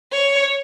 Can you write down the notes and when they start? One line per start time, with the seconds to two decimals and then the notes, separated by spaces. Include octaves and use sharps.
0.12 C#5